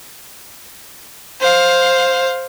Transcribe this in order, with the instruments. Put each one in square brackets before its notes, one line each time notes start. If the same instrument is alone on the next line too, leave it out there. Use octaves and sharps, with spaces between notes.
[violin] C5 F5